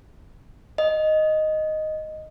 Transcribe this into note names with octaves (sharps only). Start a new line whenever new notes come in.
D#5